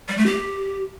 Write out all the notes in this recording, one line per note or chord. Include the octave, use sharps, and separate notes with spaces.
G3
A3
G4